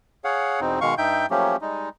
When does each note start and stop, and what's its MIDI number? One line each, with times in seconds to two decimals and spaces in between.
0.24 0.60 68
0.24 0.60 73
0.24 0.60 77
0.24 0.60 78
0.61 0.79 40
0.61 0.79 47
0.61 0.79 60
0.61 0.79 63
0.81 0.95 47
0.81 0.95 51
0.81 0.95 56
0.81 0.95 77
0.81 0.95 85
0.98 1.26 43
0.98 1.26 63
0.98 1.26 76
0.98 1.26 79
0.98 1.26 91
1.30 1.56 53
1.30 1.56 54
1.30 1.56 57
1.30 1.56 58
1.30 1.56 61
1.30 1.56 67
1.61 1.89 55
1.61 1.89 56
1.61 1.89 63